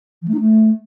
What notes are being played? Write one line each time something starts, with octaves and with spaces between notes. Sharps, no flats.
F3
A3
D#4
A3